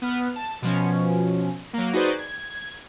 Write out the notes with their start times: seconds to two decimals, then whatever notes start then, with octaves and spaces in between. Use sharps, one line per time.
0.02 B3 F6
0.36 A5
0.62 B2 F3 C#4
1.73 F#3 A#3
1.93 D#4 F#4 G#4 B4 C5 D5
2.19 G#6